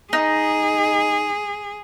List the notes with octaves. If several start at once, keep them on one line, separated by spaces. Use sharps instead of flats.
D#4 G#4